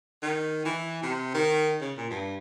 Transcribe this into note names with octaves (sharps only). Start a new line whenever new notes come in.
D#3
E3
C3
D#3
C#3
A#2
G2